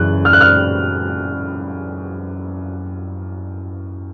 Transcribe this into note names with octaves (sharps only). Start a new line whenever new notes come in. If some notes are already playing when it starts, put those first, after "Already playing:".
Already playing: F#2 C#3 E3 F#6
F6
F#6
F6